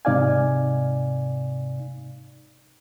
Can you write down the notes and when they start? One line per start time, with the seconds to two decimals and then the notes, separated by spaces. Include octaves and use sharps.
0.05 G#2 C3 D#4 D5 F5 G#5